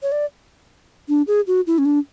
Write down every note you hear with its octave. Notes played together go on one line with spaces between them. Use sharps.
C#5
D5
D4
G#4
F#4
E4
C#4
D4